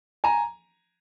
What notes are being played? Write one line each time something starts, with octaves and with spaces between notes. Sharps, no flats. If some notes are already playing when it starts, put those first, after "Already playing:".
G#5 A#5